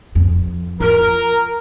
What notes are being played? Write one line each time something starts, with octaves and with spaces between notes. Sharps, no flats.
F2
F4 A#4